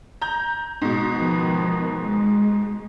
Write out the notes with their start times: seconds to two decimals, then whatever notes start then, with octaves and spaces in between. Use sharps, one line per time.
0.22 A#5 G6
0.81 G#2 B2
1.14 D#3 F3 B3
1.97 G#3